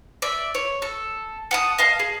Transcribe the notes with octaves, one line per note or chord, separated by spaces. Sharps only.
D5 E5
C#5
A4
F#5 A5 D#6
D#5 F5 A5
G#4